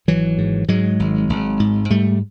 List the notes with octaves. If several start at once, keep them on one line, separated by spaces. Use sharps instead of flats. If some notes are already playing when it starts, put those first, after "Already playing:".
G#1 E3 F#3
G#2
G#2 F#3 G#3
G#1
G#1
G#2
G#2 G3 A3